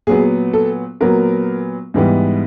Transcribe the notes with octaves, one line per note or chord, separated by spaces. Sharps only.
A#2 F#3 B3 G#4
A4
A#2 F#3 B3 A#4
G#2 E3 G3 B3